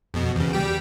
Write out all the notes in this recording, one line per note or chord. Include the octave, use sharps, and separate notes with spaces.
F2 B2
E2 C#3
G3 G4 G5